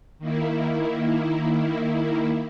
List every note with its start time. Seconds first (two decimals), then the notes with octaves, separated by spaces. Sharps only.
0.19 D#3 A#3 E4